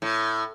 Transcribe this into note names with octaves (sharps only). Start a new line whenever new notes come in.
A2